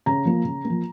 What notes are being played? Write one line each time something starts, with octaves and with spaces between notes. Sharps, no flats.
C#3 A#5
F3 A#3
C#3
A#3
F3